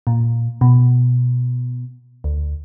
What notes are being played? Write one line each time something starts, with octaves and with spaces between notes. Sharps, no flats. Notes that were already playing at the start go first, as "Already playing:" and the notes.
A#2
B2
D2